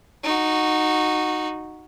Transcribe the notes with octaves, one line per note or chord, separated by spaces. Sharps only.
D#4 F#4